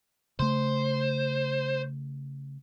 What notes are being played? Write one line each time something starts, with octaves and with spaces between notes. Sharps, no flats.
C#3 A3 C5